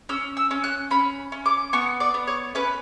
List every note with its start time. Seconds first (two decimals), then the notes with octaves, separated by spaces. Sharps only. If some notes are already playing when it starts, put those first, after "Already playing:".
0.09 C#4 E6
0.37 E6
0.51 C#4
0.64 F#6
0.91 C#4 B5
1.32 C#4
1.46 D6
1.73 B3 C#6
2.00 D5
2.14 B3
2.27 C#5
2.55 C#4 B4